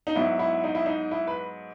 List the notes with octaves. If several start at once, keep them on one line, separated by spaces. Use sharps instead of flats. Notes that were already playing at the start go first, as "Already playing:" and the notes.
D#4
G#2 F#3 B3 E4
E4
D#4
E4
D#4
E4
B4